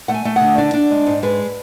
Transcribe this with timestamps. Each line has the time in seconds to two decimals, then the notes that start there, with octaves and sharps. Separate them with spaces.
0.08 A3 F#5
0.14 G#5
0.25 A3
0.36 D3 F#5
0.58 D4 D5
0.74 D4
0.91 G#3
1.07 G#2
1.23 G#3 B4